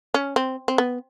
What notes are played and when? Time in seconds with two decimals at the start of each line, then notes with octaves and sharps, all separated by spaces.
0.14 C#4
0.36 C4
0.68 C4
0.78 B3